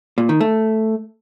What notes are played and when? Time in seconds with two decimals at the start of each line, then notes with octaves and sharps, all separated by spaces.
0.18 A#2
0.29 D#3
0.41 A3